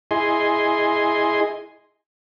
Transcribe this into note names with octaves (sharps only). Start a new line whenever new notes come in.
E4 G#4 D#5 G#5 C6